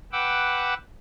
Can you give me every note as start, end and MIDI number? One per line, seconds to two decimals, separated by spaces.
0.12 0.74 71
0.12 0.74 78
0.12 0.74 79
0.12 0.74 86
0.12 0.74 88